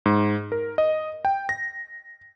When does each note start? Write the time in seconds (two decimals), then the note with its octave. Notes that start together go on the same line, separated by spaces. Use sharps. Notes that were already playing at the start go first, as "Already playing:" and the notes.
0.06 G#2
0.52 A#4
0.78 D#5
1.25 G5
1.49 A#6